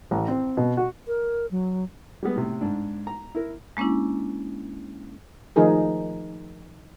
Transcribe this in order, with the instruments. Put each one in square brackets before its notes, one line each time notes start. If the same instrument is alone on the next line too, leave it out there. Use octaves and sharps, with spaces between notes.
[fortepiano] A1
C4
B2
F#4
[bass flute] A#4
F#3
[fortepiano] G3 G#3 B3 B4
A2 C3
G#2 D4
A#5
E4 A#4
[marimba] G#3 A#3 C#4 D4 E4
[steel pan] D#3 F3 A3 D#4 G#4 A#4